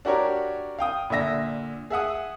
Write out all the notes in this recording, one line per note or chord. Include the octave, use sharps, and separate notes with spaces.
D4 F#4 G4 A#4 C#5
F5 G5 D#6
A#2 D3 E5 A#6
G#4 E5 F#5 D#6